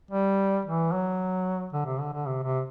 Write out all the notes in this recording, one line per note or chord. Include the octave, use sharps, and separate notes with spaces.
G3
E3
F#3
D3
C3
D3
D3
C3
C3